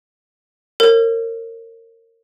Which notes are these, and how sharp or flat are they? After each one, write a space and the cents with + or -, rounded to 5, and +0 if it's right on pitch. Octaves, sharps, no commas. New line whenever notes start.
A#4 -30 C#5 -35